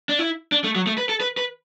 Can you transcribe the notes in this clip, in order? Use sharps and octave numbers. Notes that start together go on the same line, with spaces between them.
D4
E4
D4
A3
F#3
A3
B4
A4
B4
B4